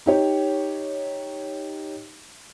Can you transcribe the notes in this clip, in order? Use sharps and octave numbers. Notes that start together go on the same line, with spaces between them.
D#4 G4 C#5